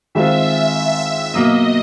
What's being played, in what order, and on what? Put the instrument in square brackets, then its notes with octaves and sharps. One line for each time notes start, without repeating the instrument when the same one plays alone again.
[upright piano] D#3 G#3 C4 F4 [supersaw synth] E5
[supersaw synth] E5
[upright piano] B2 F#3 A#3 [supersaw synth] D#5